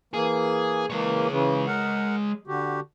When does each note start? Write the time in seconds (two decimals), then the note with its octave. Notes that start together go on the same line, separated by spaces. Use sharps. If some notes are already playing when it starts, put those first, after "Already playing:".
0.13 E3 A#3 G#4
0.90 E3 G#3 A#3 C#5
1.31 C#3 E3
1.67 A#4 F#5
2.47 D3 F#4 G4